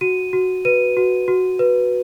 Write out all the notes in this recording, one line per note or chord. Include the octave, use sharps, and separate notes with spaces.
F#4 D#7
F#4
B4 D#7
F#4
F#4
B4